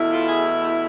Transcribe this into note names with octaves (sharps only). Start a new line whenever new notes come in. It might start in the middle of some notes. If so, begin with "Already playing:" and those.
Already playing: E2 B2 A3 E4
F4 A4
G#4